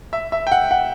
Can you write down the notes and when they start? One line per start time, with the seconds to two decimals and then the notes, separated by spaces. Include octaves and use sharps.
0.13 E5
0.32 E5
0.47 G5
0.52 F#5
0.71 F#5